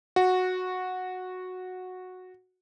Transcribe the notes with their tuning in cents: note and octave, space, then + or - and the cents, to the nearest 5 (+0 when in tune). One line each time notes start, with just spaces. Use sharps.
F#4 -10